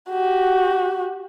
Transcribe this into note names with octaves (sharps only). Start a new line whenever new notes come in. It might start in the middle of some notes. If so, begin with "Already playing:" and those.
F#4 G4